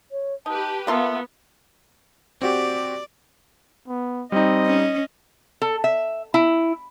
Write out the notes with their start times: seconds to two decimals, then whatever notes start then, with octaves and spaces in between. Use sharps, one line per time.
0.11 C#5
0.46 D#4 G4 B4 A5
0.87 A#3 B3 F4 A4 E5
2.42 C4 F#4 G4 D5
3.88 B3
4.32 G3 C4 D#4 D#5
4.66 C#4
5.62 A4
5.84 E5
6.34 E4